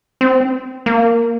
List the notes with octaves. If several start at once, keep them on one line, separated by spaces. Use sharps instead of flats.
C4
A#3